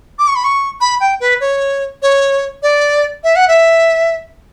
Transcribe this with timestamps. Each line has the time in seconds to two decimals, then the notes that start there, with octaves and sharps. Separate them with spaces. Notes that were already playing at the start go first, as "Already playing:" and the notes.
0.19 D6
0.28 C#6
0.36 B5
0.44 C#6
0.81 B5
1.00 G5
1.20 B4
1.41 C#5
2.02 C#5
2.63 D5
3.24 E5
3.36 F#5
3.48 E5